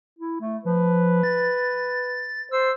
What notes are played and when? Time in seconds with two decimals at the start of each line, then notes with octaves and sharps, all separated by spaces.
0.19 E4
0.41 A3
0.65 F3 B4
1.23 A6
2.51 C5 E6